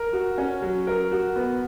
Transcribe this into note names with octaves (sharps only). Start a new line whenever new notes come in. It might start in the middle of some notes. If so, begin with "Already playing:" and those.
Already playing: A#4
F#4
C#4
F#3
A#4
F#4
B3